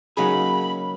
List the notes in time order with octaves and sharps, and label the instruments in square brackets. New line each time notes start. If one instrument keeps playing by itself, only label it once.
[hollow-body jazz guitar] C#3 F#3 A#3 D#4 G#4 [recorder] B5